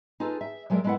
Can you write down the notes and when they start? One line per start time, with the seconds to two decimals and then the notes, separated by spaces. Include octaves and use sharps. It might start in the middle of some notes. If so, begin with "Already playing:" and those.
0.20 D#4 F4 G#4 A4 B4
0.41 E5
0.70 F#3 G#3 A3 A4 A#4 D5
0.84 G#3 A3 B3 E4 A#4 F#5